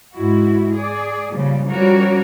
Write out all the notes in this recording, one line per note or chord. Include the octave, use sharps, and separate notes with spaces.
G#2 E4 F#4
G#4 D5
A#2 C#3 F3 G3
F3 G3 C#4 F#4 A#4 C#5